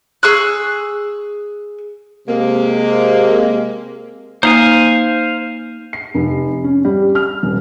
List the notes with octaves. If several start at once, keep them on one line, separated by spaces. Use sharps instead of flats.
G#4 C#6 E6 F#6
C3 G#3 A#3
A#3 D#4 C5 F5 G#5
C7
F1
C#4
G3
F6
D#1